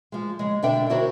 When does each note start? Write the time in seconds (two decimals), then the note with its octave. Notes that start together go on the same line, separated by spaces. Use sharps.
0.12 F3 G#3
0.39 C#3 G#3
0.63 B2 D3 D4 E5 G5
0.90 D4 E4 F#4 A#4 C5 C#5